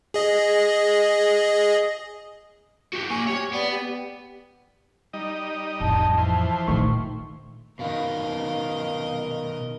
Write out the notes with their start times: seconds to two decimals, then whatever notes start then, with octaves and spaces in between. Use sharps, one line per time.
0.14 G#4 D#5
2.94 F#4 G4
3.10 A#3 G#5 C#6
3.28 G4 C#5
3.53 B3 D5
3.71 G4
5.13 G3 D#4 D#5
5.80 A1 F2 A5
6.18 E3 F3 C5
6.68 A#2 D3 D#3 A3 C#6
7.79 B2 D#3 A#4 D#5 F5